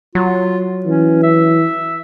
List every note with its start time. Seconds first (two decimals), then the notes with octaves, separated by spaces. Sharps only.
0.15 F#3 F4
0.86 E3 C#4
1.23 E5